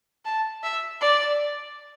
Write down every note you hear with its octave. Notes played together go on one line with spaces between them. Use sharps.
A5
E5
D5